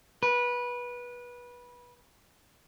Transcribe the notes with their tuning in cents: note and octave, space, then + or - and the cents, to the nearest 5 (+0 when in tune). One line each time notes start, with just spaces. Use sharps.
B4 -20